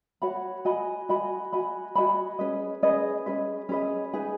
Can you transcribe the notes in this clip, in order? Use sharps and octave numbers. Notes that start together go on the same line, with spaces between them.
F#4 C#5 F#5 B5
F#4 D#5 G#5 B5
F#4 D#5 G#5 B5
F#4 D#5 G#5 B5
F#4 D#5 G#5 B5
C#4 G#4 B4 D#5
C#4 G#4 B4 D#5
C#4 G#4 B4 D#5
C#4 G#4 B4 D#5
D#4 G#4 B4 G#5